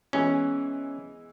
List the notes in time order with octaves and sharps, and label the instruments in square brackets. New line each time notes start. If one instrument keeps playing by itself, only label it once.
[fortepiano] E3 G#3 B3 [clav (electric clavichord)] C#4